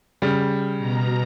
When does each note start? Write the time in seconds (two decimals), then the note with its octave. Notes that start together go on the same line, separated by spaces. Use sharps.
0.22 C#3 G3
0.78 B2 A#5